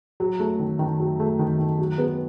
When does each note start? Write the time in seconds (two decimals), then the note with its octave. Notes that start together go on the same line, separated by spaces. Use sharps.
0.20 F#3
0.40 A3
0.60 D#3
0.79 D#3
1.00 F#3
1.20 A3
1.39 D#3
1.59 D#3
1.79 F#3
1.98 B3